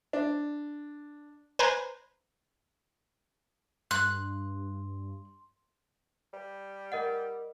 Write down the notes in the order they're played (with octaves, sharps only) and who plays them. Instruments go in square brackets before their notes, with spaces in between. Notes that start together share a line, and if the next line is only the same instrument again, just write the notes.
[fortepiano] D4
[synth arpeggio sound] B4 C5 G#5 A#5 C6
[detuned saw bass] G2 [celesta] C6 [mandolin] F#6
[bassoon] G3
[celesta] A#4 D#5 F#5